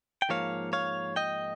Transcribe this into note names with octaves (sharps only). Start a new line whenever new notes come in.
G5
G#2 F3 A#3 C#5 F5
C#5 F5
D#5 G5